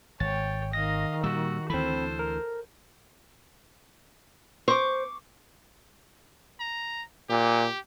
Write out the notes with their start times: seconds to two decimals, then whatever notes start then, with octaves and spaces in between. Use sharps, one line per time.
0.20 G#1 C#5 G5 A6
0.73 D#3 D#5 F5 A#6
1.24 A#2 G3 F#4 E6
1.70 D2 E3 C4 A4 C5 B5
2.19 A#4
4.68 C5 C#6 D6
6.59 A#5
7.30 A#2 G4